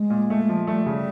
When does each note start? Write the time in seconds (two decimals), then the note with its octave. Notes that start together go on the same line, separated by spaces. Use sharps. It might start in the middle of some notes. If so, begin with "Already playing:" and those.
Already playing: G#3
0.10 A#2
0.30 A3
0.49 F3
0.67 G3 A3
0.86 C#3 G3